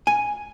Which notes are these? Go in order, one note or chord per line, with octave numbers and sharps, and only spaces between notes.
G#5